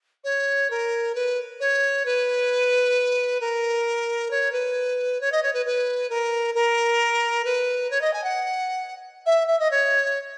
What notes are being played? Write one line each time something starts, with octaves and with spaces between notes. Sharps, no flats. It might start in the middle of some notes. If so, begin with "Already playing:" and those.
C#5
A#4
B4
C#5
B4
A#4
C#5
B4
C#5
D#5
C#5
B4
B4
A#4
A#4
B4
C#5
D#5
G#5
F#5
E5
E5
D#5
C#5